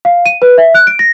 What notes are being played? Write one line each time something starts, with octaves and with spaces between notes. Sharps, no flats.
F5
D#7
B4
E5
F#6
D7
A#6